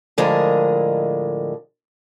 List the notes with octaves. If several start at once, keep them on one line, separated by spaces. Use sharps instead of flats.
A2 D3 F3 G#3 A#4 D#5